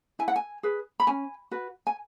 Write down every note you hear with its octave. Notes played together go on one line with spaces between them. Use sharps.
E4 G#5
F#5
G#5
G#4 B4
B5
C#4 G#5
F#4 B4
G#5